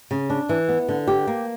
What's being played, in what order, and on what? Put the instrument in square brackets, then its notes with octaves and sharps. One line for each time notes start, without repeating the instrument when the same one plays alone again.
[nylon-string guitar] C#3
D4
E3
B3
D3
G4
A#3